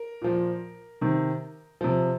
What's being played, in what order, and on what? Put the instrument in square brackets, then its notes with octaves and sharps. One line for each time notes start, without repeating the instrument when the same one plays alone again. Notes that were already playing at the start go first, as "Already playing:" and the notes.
Already playing: [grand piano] A#4
A#2 F3
C3 D#3
C3 F3